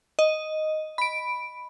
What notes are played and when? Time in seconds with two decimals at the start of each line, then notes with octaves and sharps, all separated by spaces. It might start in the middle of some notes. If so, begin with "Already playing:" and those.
0.19 D#5
0.98 B5 D7